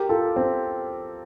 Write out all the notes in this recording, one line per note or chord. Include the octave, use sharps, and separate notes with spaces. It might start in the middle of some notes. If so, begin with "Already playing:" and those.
Already playing: G4 A#4
F4 A4
C4